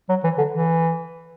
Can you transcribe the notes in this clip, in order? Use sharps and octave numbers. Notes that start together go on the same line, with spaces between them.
F#3
E3
D3
E3